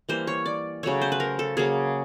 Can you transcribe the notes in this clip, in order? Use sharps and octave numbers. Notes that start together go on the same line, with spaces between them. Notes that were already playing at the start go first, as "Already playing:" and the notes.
E3 G3 A#3 C5
C#5
D5
C#3 F#3 A3 C#5
C5
B4
A#4
A4
C#3 F#3 A#3 G#4